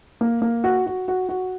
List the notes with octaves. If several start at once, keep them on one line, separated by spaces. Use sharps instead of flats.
A#3
A#3
F#4
F#4
F#4
F#4